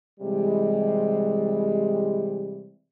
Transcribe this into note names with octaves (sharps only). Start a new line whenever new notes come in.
C3 E3 G3 G#3